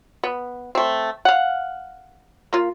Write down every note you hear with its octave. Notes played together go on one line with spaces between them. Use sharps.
B3
A3 C4
F5 F#5
A#3 F4